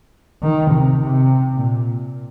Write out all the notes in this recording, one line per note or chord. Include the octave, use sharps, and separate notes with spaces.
D#3
C3
C3
A#2